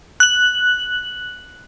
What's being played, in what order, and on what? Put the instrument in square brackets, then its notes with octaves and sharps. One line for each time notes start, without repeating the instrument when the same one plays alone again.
[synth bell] F#6 F#7